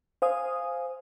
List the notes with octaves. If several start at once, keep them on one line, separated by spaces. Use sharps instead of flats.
C5 F5 G#5 D#6